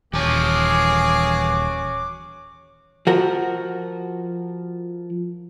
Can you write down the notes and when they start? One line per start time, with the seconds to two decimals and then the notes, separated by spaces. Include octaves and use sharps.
0.13 D#1 E3 A#3 C#4 F#4 G#4 A5 D6
3.07 F3 F#4 A#4